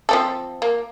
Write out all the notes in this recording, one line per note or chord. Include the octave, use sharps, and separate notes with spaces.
F3 C4 A4
A#3